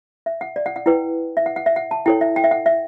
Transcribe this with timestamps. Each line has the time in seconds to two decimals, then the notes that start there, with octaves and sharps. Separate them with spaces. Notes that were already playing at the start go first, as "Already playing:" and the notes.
0.26 E5
0.41 F#5
0.56 D5
0.66 F#5
0.76 F#5
0.86 E4 B4 G5
1.37 E5
1.46 F#5
1.56 F#5
1.66 E5
1.76 F#5
1.91 A5
2.06 E4 A4 C#5 G5
2.21 E5
2.36 G5
2.44 E5
2.51 F#5
2.66 E5